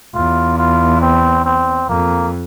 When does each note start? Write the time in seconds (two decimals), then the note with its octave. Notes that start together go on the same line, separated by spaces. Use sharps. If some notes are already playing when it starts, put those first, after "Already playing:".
0.15 E2 F4
0.58 F4
1.01 C4
1.45 C4
1.89 F2 A#3